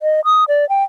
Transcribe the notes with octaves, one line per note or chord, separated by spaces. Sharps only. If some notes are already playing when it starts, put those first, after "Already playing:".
D#5
D#6
D5
G5